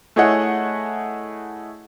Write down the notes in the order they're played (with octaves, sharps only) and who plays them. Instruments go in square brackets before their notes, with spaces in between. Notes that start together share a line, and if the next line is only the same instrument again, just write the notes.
[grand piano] A3 E4 G#4 C#5 D#5 F#5